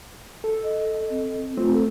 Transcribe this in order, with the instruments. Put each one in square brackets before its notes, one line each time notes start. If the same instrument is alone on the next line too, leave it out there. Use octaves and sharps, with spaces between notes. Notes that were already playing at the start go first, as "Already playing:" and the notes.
[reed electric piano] A4
[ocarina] D#5
C4
[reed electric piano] A3 C4 [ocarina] F4
[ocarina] A4